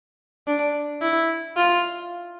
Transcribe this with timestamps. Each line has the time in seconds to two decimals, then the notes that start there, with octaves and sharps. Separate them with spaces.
0.47 D4
1.02 E4
1.56 F4